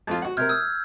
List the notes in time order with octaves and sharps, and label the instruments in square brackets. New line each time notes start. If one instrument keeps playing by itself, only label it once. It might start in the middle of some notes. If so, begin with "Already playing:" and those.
[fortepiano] F2 F4
F#4 F#5
[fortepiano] C3 A#4 [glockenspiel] F6 G6 G#6
[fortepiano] D#6 [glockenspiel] E6